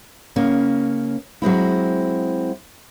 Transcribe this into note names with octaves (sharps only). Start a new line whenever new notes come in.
C#3 A#3 C#4
F#3 G#3 C4 E4